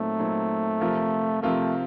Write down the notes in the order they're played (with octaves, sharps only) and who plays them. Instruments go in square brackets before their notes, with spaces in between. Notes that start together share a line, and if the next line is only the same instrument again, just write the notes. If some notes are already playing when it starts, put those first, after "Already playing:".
Already playing: [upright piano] A#2 F#3 C4 D#4 [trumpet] A3
[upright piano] A#2 F#3 C4 D#4
C3 F3 C4 F4 A#4
[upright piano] C3 F3 C4 F4 A#4 [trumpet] A3